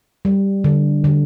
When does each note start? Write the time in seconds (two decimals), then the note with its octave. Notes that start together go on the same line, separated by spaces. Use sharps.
0.25 G3
0.64 D3
1.04 D3